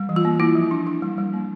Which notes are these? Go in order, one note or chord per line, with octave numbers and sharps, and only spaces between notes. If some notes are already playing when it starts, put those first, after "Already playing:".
Already playing: G3
E3
F4
A#3
A#3 E4
F3
D4
D4
G3
G3
A#3